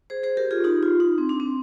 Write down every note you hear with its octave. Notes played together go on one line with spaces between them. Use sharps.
G#4 C5
G#4 C5
G4 A#4
F4 G#4
D#4 G4
F4
D#4
C4
D4
C4